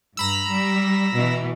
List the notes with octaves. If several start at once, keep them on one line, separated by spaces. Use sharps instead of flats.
G2 A#5 B5 E6
G3
B2 E3